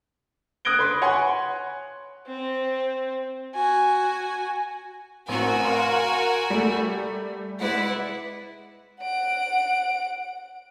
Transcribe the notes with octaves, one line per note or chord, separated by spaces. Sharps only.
D#6 F#6 G#6 A#6 D7 G7
B4 C6
C#5 F#5 G#5 B5 C6
C4
F#4 G#5
A1 C4 F#4 A#4 G#5
F5 C6
G3 A3
G#3 E4 B4 D5 F#5
F#5 D7